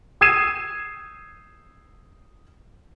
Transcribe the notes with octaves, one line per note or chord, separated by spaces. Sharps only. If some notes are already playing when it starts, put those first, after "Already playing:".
D#6 E6 G#6 C7 D#7 E7